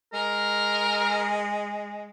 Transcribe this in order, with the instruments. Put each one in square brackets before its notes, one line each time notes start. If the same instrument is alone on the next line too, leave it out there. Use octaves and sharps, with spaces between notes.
[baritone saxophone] G#3 [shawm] A#4